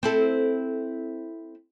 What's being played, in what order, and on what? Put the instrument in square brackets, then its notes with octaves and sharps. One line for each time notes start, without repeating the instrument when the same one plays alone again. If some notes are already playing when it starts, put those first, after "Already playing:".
[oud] C4 E4 A4